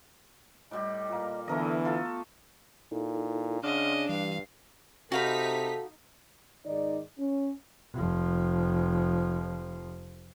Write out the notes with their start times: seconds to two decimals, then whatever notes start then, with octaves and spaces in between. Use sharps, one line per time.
0.71 A2 G3 G4 D#5
1.09 A#2 A#3
1.48 D3 E3 A3 B3 A#4 D#5
1.85 F4 A4
2.92 A#2 D#4 E4 A4
3.63 C#3 D4 D#5 F#5 C6 F6
4.09 G2 E3 G3 F5
5.12 C3 D#4 F#4 A4 F5 B5 B6
6.66 G#2 D#3 D#4 D5
7.18 C#4
7.94 F1 F3